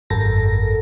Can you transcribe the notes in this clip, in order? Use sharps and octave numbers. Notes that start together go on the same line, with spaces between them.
G#1 F#2 A4 A#4 A#6